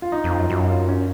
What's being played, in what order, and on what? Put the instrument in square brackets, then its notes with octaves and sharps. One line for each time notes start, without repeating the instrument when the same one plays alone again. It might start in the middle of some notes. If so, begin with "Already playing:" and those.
[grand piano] F4
D#4
[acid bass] F2
[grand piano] F4
[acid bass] F#2
[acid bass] F#2 [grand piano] F#4
[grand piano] F4
C#4